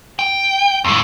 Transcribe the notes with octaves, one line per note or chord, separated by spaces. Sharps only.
G5
F2 A2